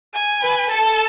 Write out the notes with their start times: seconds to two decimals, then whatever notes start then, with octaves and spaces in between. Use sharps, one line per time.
0.14 G#5
0.42 B4
0.70 A4 A5